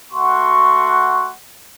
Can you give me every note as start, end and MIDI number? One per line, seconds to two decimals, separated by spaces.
0.12 1.30 57
0.12 1.30 66
0.12 1.30 78
0.12 1.30 84
0.12 1.30 85